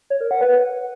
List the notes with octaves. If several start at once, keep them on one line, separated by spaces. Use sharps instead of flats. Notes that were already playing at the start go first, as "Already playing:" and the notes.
C#5
A#4
F#5
B4